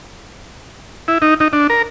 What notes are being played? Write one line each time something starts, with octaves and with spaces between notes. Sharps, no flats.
E4
D#4
D#4
D4
A#4